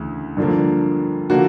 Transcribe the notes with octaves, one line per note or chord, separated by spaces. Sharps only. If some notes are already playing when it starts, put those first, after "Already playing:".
Already playing: D2 C#3 E3
G2 D3 F3 A#3
D3 F3 A#3 F#4